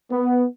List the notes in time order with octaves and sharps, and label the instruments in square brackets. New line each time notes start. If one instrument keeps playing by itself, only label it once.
[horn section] B3